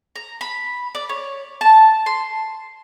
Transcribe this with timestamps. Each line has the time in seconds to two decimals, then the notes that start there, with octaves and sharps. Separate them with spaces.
0.16 A#5
0.41 B5
0.95 D5
1.09 C#5
1.61 A5
2.06 C6